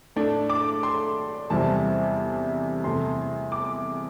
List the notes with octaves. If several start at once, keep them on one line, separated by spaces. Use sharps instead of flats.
A2 A3 D4
D6
C6
E2 C3 G3 C4 A5
E2 C3 A3 C6
D6